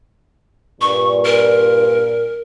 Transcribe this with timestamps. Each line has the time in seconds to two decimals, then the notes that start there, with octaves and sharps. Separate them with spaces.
0.81 G2 A#2 C#6
1.25 A#4